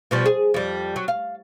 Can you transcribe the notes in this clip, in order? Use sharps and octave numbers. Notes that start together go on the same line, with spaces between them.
B2 F3 G3
G#4
F2 G3
F#3
F5